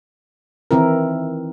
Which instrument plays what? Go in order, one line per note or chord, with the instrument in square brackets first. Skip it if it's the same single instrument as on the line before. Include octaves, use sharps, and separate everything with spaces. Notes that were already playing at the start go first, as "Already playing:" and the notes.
[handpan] D#3 E3 C4 E4 A#4